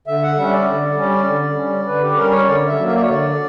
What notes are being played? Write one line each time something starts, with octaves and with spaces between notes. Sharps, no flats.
D3 E5
F#5
G3 C#4 E5
D5
D3
G3 C#4
D3
G3 C#4
D3 B4
G4
G3 C#4 A#4
C#5
D3 D5
E5
F#3 A#3
E5
D5
C#5
D3 D5